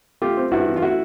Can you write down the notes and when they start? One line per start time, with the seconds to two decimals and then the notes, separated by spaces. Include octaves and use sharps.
0.22 A3 F4 G4
0.37 C4
0.51 G2 E4 F#4
0.67 E3
0.76 F4
0.82 A3 E4 F#4